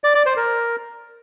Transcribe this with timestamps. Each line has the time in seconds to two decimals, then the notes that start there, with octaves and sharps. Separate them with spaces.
0.04 D5
0.15 D5
0.26 C5
0.37 A#4